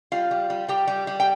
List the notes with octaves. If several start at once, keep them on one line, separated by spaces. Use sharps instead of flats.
G3 F4 F5
G3
G3
G3 G4 G5
G3
G3
G5